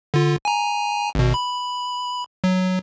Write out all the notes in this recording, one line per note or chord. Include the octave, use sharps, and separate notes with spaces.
D3 F4
G#5 A#5
G#1 B2
B5
F#3